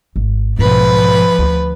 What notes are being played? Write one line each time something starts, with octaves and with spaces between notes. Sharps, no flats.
G#1
B1 G#2 F3 B4
D2 D3